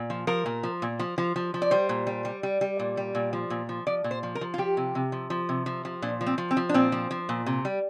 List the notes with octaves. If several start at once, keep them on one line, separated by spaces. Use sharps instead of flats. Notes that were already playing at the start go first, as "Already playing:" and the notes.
Already playing: A#2
F3
F3 A#4
A#2
F3
A#2
F3
F3
F3
F3
D5
G3 C5
A#2
G3
G3
G3
G3
A#2
G3
A#2
F3
A#2
F3
F3 D5
A#2
C5
F3
A#4
F3
F4
F3 G4
C3
C3
F3
F3
C3
F3
F3
A#2 D4
F3
C4
F3
C4
F3
D4
A#2 C4
F3
F3
A#2
C3
G3